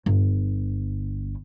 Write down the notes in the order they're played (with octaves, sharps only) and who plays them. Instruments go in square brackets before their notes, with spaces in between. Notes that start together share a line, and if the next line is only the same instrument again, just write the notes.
[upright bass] G1